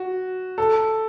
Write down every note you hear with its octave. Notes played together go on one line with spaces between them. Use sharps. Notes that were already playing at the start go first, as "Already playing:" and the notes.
Already playing: F#4
A4